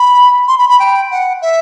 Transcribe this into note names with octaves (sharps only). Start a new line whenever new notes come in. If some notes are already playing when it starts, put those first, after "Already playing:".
Already playing: B5
C6
B5
B5
G5
F#5
E5